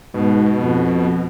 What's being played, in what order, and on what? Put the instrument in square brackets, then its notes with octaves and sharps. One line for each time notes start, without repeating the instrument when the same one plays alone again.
[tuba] G#2 [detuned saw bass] B2
[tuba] F2